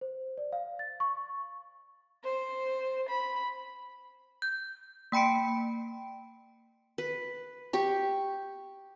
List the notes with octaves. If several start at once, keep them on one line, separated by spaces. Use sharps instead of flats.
C5
D5
F5
A6
C#6
C5
B5
G6
A#3 G5 B5 C#7 D7
B4
G4 C#6